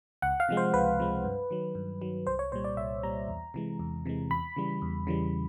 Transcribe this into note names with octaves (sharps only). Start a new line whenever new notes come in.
C#2 F#5
F5
C3 F3 G#3
C5
C#2 B4
C3 F3 G#3
G2
D#3 F#3
G2
D#3 F#3
C2 C5
C#5
A#2 G3 C5
D5
C2 E5
A#2 G3 A#5
E2
C3 E3 G#3
E2
C3 E3 G#3
E2 B5
C#3 E3 G3
E2
C#3 E3 G3